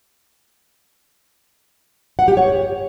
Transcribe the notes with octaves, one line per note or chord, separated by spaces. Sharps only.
F#5
G4
C#5